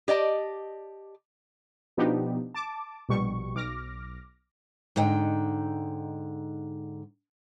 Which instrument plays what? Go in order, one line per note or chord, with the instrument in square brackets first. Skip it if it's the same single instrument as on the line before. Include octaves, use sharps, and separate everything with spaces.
[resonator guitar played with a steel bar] G4 D5 D#5 A5
[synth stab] B2 F3 B3 D4 D#4 G4
A5 D6
A#1 B2 G3 C#6
B1 D6 F6 A#6
[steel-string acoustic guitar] G#2 D3 D#4 G5